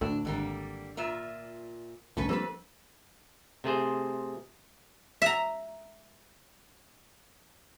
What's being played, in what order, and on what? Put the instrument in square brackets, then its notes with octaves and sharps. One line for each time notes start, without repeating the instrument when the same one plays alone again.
[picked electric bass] D2 A2 A3 [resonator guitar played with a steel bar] D4
[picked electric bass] G#1 [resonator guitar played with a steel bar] D3 G3 A#3
[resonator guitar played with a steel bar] A#2 F4 E5
[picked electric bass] G1 C2 A2 [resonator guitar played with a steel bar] C#4 A4 B4
[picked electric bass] F3 G3 A#3 [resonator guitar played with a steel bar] C4 A4 B4
[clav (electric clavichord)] C3 A3 G#4 C5
[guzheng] E5 A#5